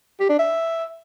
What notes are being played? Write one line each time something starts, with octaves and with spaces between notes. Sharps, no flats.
G4
D4
E5